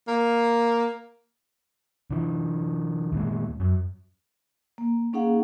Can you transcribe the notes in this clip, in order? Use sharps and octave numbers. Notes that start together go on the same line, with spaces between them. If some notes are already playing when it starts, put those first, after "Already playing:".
A#3
D3 E3
D#2 A#2 G#3
F#2
A#3
A#3 C#4 D#4 G#4 F5 F#5